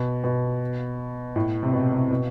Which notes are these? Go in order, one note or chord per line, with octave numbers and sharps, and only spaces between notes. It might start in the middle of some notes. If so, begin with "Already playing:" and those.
Already playing: B2
B2
A2
C3
B2
C3
B2